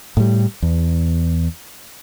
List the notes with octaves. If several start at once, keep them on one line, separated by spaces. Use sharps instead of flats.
A2 G3
E2